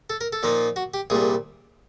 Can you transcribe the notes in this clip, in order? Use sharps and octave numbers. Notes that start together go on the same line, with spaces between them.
A4
A#4
A4
A#2 F3 A#3 D#4
F#4
G4
C2 A#2 G3 G#4